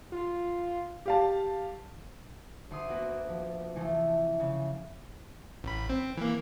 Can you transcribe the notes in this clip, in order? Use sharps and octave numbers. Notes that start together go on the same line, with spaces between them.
F4
G4 F5 A5
D2 C6 D#6
A#3 B3 F#4
F3
C3 E3 F3 A3
C#3
A1 B5
C4
E3 A#3